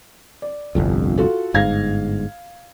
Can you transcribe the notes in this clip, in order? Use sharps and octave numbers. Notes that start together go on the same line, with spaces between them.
D5
G1 C2 F2
F4 F#4 A4
G1 G#2 F5 G#6 A#6